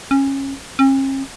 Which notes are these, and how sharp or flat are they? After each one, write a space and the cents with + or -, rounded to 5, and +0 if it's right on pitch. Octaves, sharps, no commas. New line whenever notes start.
C#4 -20
C#4 -45